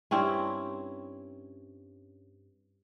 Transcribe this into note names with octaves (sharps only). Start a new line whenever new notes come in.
G2 C4 C#4 E4